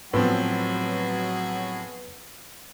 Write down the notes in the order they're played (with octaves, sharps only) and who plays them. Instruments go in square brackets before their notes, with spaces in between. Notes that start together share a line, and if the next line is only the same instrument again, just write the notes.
[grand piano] A2 F3 C4 [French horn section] F#3 [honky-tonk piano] B3 [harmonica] F#4 G#4